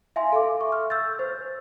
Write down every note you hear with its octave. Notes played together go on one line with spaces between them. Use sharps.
E5 F5 G#5 C6
A4 E5 D6
C#6
F6
E6 G6 A6
C5